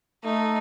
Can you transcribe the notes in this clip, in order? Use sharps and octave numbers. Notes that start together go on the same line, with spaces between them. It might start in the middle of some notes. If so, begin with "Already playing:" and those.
A3 D#4